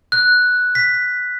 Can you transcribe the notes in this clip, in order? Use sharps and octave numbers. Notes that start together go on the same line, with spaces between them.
F#6
B6